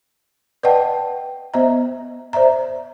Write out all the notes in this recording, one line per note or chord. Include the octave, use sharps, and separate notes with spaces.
B4 D5 D#5 F#5 G5 A5
B3 C5 D#5 E5 A#5
C5 D5 E5 A#5